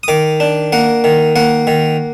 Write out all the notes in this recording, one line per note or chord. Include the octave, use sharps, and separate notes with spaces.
D#6
D#3 D6
D4
A#3 F#5
D#3
A#3 F#5
D#3